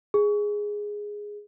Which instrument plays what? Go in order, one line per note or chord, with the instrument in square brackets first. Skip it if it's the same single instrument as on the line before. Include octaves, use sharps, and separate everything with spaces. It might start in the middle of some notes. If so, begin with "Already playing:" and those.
[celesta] G#4